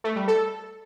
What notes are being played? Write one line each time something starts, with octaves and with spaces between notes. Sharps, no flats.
A3
G3
A4